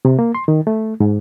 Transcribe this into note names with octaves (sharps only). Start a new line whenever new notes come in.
C3
A#3
C6
D#3
A3
G#2